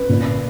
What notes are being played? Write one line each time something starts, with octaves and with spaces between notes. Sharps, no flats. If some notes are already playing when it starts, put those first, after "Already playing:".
Already playing: B4
A#2